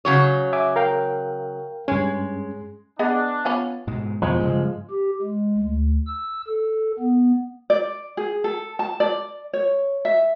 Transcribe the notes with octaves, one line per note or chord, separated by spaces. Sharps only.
C#3 F#3 C#5
E5 G#5 D6
A#4 F5 G5
G2 G#3 C#4
B3 D4 G#4 D#5
B3 C#4 F4
G#2 B2 G#3
E2 B2 D#3 F3 G#3
G2 C#3 A#3
G4
G#3
D2
E6
A4
B3
D5
G#4
A4
A5
D5
C#5
E5